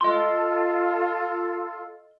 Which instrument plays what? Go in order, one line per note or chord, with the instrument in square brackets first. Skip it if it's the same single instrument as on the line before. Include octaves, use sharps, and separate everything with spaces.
[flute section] F4 A4 [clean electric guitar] D#5 C6